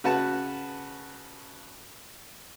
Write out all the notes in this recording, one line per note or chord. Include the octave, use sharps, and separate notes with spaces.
C#3 F#4 B4 F#5 A5 B5